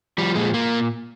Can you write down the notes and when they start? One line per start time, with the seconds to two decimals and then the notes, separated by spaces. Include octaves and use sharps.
0.18 F3 G3
0.35 A#2 G#3
0.54 A#2 A#3